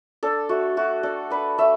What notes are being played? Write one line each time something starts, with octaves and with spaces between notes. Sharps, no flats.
D4 A4
A3 F#4
A3 F#4
D4 A4
D4 B4
A3 E5